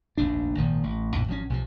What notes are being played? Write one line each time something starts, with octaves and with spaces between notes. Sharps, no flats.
F1 A#1 D#2 D4
G#1 A#2 D#3 F3
A1
A#1 F2 A2
G#1 F3 F#3 C#4
B1 C3 F3